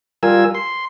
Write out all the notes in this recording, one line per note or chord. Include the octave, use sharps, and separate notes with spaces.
G3 F4 A#4 G#5 E6
C6